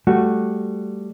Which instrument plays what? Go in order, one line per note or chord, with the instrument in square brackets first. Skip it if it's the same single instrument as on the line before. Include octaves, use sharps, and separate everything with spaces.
[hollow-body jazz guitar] G3 A3 F#4